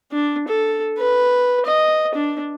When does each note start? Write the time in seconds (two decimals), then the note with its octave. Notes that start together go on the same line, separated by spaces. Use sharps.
0.12 D4
0.48 A4
0.98 B4
1.66 D#5
2.14 D4